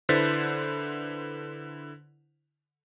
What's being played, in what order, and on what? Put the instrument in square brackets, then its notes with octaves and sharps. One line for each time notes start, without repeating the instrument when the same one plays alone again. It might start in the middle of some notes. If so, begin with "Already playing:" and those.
[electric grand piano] D3 E4 B4 C5 A6 B6